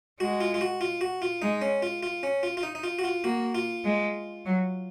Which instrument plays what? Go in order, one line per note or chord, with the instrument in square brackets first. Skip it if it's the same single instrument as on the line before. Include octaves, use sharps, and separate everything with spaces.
[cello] G#3 [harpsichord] F#4
[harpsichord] F4
F4
F#4
F4
F#4
F4
[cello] G#3 [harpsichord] D#4
[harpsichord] C#4
F4
F4
C#4
F4
F4
D#4
D#4
F4
F#4
F4
[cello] A#3 [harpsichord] F#4
[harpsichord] F4
[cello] G#3
F#3